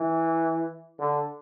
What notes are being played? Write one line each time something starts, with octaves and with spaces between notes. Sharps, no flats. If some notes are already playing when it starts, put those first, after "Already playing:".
Already playing: E3
D3